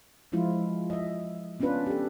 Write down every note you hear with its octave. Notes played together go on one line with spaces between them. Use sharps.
E3 F3 G#3 E4 F4
D#5 E5
B3 C#4 D4 F4 B4
G4 A4